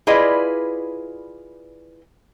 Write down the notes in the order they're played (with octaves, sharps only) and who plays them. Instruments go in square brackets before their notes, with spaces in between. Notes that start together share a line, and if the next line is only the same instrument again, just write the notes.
[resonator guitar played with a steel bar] E4 F4 G#4 B4 D5 D#5